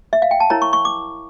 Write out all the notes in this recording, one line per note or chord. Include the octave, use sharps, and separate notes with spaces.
E5
F5
G5
A5
E4 A#4 C#5 A#5
C#6
C#6
D6